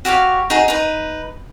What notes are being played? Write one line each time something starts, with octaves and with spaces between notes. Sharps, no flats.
F#4 G4 C#5 F5
D#4 F#4 G#4
D#4 B4